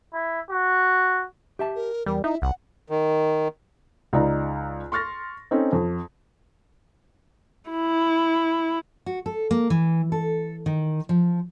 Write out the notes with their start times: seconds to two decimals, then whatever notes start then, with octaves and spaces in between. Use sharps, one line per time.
0.13 E4
0.50 F#4
1.59 G4 E5 A5
1.76 A#4
2.06 E2 G3 A#4
2.24 D#4 E4 E5
2.42 C2 F#5
2.90 D#3
4.13 C#2 D#4 D5 A#5
4.92 C6 C#6 F6 A6 A#6
5.51 C4 C#4 D#4 A4
5.73 F2
7.70 E4
9.06 F#4
9.26 A4
9.51 A#3
9.70 E3
10.12 A4
10.66 D#3
11.09 F3